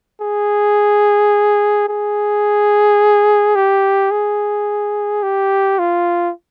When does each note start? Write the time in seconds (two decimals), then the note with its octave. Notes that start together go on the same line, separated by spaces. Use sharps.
0.21 G#4
1.89 G#4
3.56 G4
4.11 G#4
5.23 G4
5.79 F4